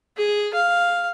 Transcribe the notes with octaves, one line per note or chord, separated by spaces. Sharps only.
G#4
F5